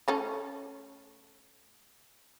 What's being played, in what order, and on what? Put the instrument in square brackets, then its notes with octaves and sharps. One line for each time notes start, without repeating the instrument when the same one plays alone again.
[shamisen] A3 C#4 A4